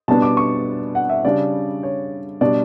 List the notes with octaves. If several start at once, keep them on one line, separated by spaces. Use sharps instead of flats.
B2 G3 B3 D4 A5
D6
C#6
F#5
E5
C#3 G3 D4 D5
C#5
B2 G3 D4 D5